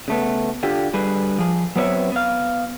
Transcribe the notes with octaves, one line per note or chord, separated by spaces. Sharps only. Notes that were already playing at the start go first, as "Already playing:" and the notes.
C#3 A3 B3
D3 F4 G4
D3 G3 G#4 B4
F3 G#4
F#3 B3 C4 B4 C#5 E5
B3 F5